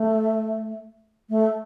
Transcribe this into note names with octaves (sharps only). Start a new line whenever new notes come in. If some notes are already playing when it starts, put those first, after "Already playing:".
Already playing: A3
A3